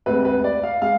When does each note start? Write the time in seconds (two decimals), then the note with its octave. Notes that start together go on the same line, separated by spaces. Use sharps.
0.06 D2 C3 G#3 B4
0.25 B4
0.44 D5
0.63 F5
0.82 G#3 F5